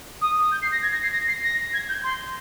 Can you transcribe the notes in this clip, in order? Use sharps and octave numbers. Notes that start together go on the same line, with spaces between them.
D#6
G6
C7
A#6
G#6
A#6
C7
A#6
C7
A#6
G#6
G6
C6